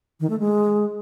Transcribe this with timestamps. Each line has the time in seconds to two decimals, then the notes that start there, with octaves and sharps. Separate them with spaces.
0.20 D#3
0.30 A3
0.40 G#3